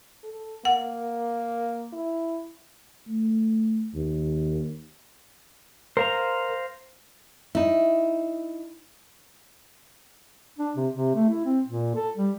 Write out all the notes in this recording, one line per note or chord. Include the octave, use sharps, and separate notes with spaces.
A4
A#3 F#5
E4
A3
D#2
A#4 C5 F5 A#5
D#4 E4
D4
C3
C3
A3
E4
C4
A#2
A4
G3